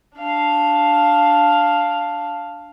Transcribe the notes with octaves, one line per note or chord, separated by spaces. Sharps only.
D4 F5